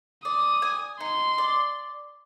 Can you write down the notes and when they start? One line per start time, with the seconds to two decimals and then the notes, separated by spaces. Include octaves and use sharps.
0.24 D5 D#6
0.62 G#5
1.00 D#4 C6
1.38 D5